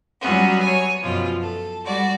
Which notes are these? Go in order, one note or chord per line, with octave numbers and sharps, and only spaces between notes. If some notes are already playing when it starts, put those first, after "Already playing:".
F#3 G3 B3 C#4 F#4
C#5 G#5
F#2 B2 F3 F4
A4
G3 F#4 D5